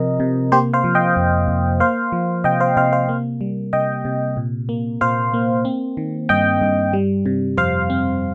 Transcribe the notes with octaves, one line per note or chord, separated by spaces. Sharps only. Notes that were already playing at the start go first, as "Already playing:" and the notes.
Already playing: C3 F3 C4 A#4 D#5
C3
A#3 G4 C5
C5 F5
F3
D#5 G5
F2
F2
A#3 C5 F5
F3
C3 D#5 G5
C5 F5
C3 C5 F5
C5 F5
A#3
G3
C3 D#5 G5
C3
A#2
A#3
A#2 C5 F5
A#3
C4
D#3
G2 D#5 G5
G2
G3
C3
F2 C5 F5
C4